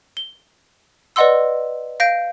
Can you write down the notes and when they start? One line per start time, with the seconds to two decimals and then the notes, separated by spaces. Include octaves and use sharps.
0.17 G7
1.16 B4 D5 D#5 F#5 C6 E6
2.00 F5 G6 A#6 D7